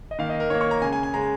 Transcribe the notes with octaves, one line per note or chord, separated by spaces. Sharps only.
D#5
D#3 A#3 F5
D#5
A#4
D#3 A#3 C#5
C#6
A#5
C#3 G#3 G#5
G#5
G#5
C#3 G#3 A#5